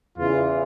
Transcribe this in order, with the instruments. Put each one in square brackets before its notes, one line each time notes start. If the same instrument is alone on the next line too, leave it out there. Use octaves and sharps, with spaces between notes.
[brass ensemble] E2 C#3 E3 F4